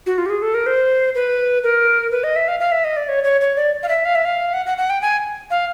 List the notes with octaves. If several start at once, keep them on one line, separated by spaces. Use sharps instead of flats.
F#4
F4
G4
G#4
A4
A#4
C5
B4
A#4
B4
D#5
E5
F5
F5
E5
D#5
D5
C#5
C#5
C#5
D5
F5
E5
F5
E5
F5
F#5
F#5
F#5
G5
G#5
F5